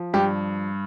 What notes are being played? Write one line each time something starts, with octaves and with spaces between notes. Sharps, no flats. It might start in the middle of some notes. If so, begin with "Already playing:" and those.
Already playing: F3
G2 G4